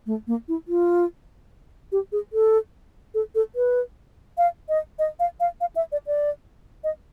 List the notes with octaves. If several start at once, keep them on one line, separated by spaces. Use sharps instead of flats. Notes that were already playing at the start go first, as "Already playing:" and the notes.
A3
A#3
E4
F4
G4
G#4
A4
A4
A4
B4
F5
D#5
D#5
F5
F5
F5
E5
D5
D5
D#5